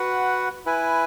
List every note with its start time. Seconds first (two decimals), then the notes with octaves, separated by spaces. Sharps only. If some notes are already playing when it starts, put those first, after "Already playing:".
Already playing: F#4 B4 F#5
0.66 E4 B4 G#5